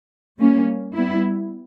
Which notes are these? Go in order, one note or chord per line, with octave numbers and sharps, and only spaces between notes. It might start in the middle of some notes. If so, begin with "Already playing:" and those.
G3 A#3 C#4
G3 B3 E4